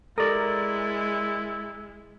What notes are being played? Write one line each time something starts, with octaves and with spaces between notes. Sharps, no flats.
G#3 E4 G4 A4 A#4 D5